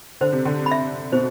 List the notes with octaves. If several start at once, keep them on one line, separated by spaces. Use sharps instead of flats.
D3 C5
C3
D3
B5
E5
B2 C5